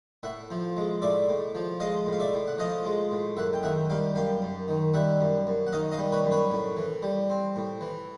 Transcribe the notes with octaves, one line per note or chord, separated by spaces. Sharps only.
A2 E5 F#5
F3
G#3
A2 D5 E5
A2
F3
G#3 D#5 F5
A2
F5
D5 E5
A2
F#5
F3 D#5 F5
G#3
A2
F#2 E5 F#5
G5
D#3 E5 F#5
G3 F5 G5
F#2 F5 G5
F#2
D#3
G3 E5 F#5
F#2
F#2
F#5
D#3 D#5 F5
D#5 F5
G3
B4 C#5
F#2
B4 C#5
A2
E3
G3
C4
A2
E3